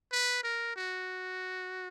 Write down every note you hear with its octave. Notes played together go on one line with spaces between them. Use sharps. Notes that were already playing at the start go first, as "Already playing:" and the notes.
B4
A#4
F#4